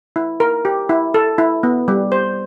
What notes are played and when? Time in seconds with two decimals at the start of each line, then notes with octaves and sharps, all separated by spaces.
0.16 E4
0.40 A#4
0.65 G4
0.89 E4
1.14 A4
1.38 E4
1.63 B3
1.88 G3
2.12 C5